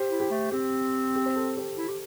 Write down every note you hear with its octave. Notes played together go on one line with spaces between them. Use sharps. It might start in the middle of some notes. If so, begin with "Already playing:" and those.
Already playing: G4 C5
E4
G4
A3
C4 G4
G4
C5
A4
G4 C5
E4
G4